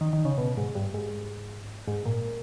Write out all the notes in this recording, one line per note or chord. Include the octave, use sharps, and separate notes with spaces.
D#3
D#3
C#3
B2
G#2
G2
G#2
G#2
A#2